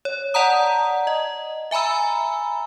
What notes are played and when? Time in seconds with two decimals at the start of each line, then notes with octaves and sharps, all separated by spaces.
0.05 C#5
0.34 D5 F#5 A5 A#5 D#6
1.07 D#5
1.71 E5 G#5 A#5 B5 E6